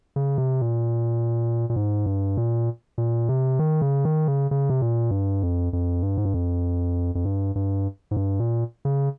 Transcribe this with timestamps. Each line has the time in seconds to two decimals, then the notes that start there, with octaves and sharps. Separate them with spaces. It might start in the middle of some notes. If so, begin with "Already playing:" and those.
0.16 C#3
0.38 C3
0.62 A#2
1.70 A#2
1.76 G#2
2.06 G2
2.37 A#2
2.98 A#2
3.29 C3
3.59 D#3
3.82 C#3
4.05 D#3
4.28 C#3
4.51 C#3
4.70 C3
4.82 A#2
5.11 G2
5.42 F2
5.73 F2
6.03 G2
6.17 G#2
6.25 G2
6.34 F2
7.15 F2
7.25 G2
7.56 G2
8.11 G#2
8.16 G2
8.40 A#2
8.85 C#3